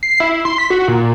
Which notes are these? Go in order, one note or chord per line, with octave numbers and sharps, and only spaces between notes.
C7
E4
C6
B6
F#4
A#2